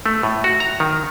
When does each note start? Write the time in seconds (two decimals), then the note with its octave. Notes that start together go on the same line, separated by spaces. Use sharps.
0.06 A3
0.23 A2
0.44 F#4
0.60 A#5
0.80 D#3